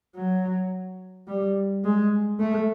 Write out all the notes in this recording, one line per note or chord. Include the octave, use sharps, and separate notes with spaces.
F#3
G3
G#3
A3